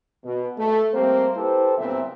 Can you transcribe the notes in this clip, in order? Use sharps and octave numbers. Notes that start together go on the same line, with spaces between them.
B2
A3
G3 A3 A#3 C4 G4 C5
E4 G4 A4 B4 C5
F#1 G2 A#2 B3 C4 E5